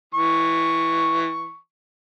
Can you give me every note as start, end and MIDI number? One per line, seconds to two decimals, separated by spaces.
0.14 1.56 52
0.14 1.56 85